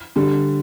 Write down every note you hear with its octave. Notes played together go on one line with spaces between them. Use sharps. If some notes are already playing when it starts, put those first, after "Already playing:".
D3 G3